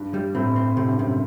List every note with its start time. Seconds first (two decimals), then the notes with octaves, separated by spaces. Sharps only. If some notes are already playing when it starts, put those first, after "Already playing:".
Already playing: G2
0.14 G3
0.35 A2 C4
0.56 C4
0.77 A2 C3
0.88 G2
0.98 F#2 C3